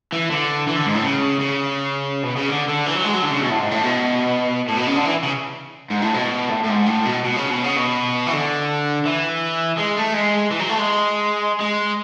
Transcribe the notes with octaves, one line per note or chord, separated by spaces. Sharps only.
E3
D3
E3
D3
G#2
A2
C#3
C#3
B2
C#3
D3
D3
E3
F#3
G#3
F#3
D3
C#3
B2
A2
G#2
A2
B2
A2
B2
C#3
D3
E3
C#3
G#2
A2
B2
A2
A2
G#2
A2
B2
B2
C#3
B2
C#3
B2
E3
D3
E3
G#3
A3
G#3
E3
F#3
A3
G#3
G#3